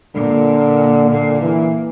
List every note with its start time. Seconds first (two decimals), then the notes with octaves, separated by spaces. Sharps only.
0.15 A#2 D3
1.10 A#2 D3
1.41 E3